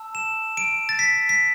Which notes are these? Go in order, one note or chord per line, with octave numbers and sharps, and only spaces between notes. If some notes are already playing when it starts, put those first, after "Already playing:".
Already playing: A5 E6
E7
D7
A6
B6
B6